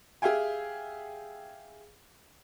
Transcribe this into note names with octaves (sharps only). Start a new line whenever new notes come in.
G4 G#4 E5 F5 G5 G#5